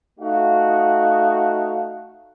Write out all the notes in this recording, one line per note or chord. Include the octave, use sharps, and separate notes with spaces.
A3 D#4 F#4 F5